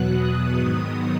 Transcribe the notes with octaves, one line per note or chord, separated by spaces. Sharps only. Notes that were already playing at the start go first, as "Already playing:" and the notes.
Already playing: E2 B2 F#3 B3 F#6
D#6
G#2 D#3 F#3 B3 D#6